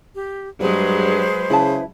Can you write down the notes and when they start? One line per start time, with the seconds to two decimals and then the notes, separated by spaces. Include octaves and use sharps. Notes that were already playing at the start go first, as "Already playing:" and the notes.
0.14 G4
0.60 G2 F#3 G#3 G#4 B4 C5
1.50 C#3 E4 A5